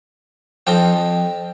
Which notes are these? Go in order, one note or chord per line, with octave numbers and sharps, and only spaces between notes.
F2 F3 C4 D#4 G5